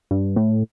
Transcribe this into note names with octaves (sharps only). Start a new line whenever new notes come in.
G2
A2